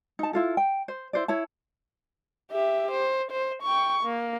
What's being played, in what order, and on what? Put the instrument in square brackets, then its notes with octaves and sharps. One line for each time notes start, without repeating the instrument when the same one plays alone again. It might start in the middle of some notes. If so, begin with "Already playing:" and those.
[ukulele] D#4 A5
E4 F4 A4
G5
C5
E4 C5 D5
E4 C#5 A5
[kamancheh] G4 E5
C5
C5
G5 C#6
A#3